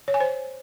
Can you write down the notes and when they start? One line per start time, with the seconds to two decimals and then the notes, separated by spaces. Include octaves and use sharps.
0.08 C#5
0.14 G#5
0.20 C5